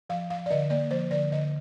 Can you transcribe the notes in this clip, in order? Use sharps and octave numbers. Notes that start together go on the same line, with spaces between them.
F3 F5
F3 F5
D5
D3 D#5
A#3 D5
F3 C5
D3 D5
D3 D#5